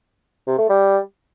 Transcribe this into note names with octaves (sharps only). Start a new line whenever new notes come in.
C3
A3
G3